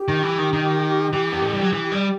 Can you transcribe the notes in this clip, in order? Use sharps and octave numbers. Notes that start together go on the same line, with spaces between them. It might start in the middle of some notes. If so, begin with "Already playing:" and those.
Already playing: G4
D#3
E3
D#3
D#3
E3
B3
A3
G3
F#3
E3
G3